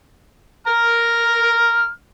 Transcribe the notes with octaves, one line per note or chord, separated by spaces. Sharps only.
A#5 F6